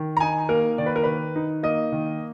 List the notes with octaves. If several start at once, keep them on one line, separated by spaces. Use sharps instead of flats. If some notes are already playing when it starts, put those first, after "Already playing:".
Already playing: D#3
A#5
D#4 G#5
A#3 A#4
D#3 D5
B4
A#4
D#3 B4
D#4
A#3 D#5
D#3